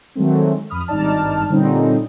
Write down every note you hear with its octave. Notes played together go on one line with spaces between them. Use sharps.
D#3 F#3 G#3 A3 C4
F2 B5 D#6 F6
G#1 G2 D#4 D5 A5 F6
A#2 D3 G3 C4 C#4 D#4